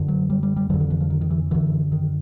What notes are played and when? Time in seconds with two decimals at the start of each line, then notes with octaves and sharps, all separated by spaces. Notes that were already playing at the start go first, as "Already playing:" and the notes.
Already playing: F#2 D3
0.08 F#3
0.30 G3
0.43 G3
0.57 G3
0.70 D3 F#3
0.74 F2
0.81 D#3
0.90 E3
1.01 F3
1.10 D#3
1.21 D#3
1.31 E3
1.51 F#2 D3 E3
1.92 D#3